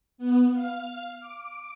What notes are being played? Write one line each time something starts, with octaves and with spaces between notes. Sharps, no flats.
B3
F5
D6